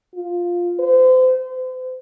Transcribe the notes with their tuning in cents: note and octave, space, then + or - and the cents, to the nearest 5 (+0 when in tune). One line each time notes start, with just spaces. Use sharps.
F4 +5
C5 -35
C5 -40